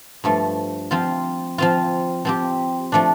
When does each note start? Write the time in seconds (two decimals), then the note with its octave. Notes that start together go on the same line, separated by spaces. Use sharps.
0.24 G2 F3 A3
0.91 F3 C4 F4
1.58 F3 C4 F4
2.25 F3 C4 G4
2.92 F3 A3 D4